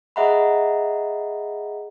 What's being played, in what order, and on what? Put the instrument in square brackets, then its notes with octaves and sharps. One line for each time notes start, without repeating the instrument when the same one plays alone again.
[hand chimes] G#4 D#5 E5 F#5 A#5 B5